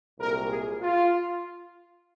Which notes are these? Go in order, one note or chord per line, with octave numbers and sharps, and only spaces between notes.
C2 A#2 G#3 A#4
G#4
F4